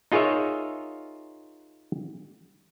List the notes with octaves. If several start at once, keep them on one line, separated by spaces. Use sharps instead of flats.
D#4 F4 G#4 A#4 C#5 E5